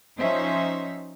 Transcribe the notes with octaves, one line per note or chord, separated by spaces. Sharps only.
F3 C#4 D#4 C5 E5